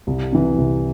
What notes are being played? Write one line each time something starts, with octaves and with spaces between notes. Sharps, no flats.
C2
C3 E3
C2